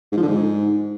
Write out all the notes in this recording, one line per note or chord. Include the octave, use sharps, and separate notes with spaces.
G#2
F3
D3
G#2